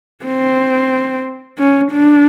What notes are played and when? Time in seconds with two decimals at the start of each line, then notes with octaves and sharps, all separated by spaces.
0.25 C4
1.58 C#4
1.92 D4